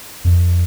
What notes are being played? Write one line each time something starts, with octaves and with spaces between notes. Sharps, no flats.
F2